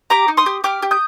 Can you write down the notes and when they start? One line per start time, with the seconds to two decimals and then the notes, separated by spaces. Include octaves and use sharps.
0.10 G4 A#5 D6
0.28 D#4
0.37 C6 D#6
0.46 G4
0.64 G4 D6 F6
0.82 G4
0.91 D#6 G6